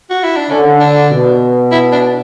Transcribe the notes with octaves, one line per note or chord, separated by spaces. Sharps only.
F#4
E4
D4
D3 C#4
D4
B2
E4
D4